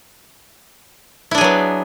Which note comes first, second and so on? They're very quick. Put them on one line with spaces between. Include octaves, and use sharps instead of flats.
E4 D4 G#4 F#3 B3